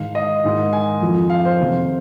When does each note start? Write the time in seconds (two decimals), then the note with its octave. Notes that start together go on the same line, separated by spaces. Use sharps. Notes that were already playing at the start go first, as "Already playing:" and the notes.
Already playing: G#2 D#3 F5
0.15 D#5
0.44 G#2 D#3
0.73 G#5
1.02 F2 F3
1.30 F5
1.45 C5
1.58 F2 C3 D#3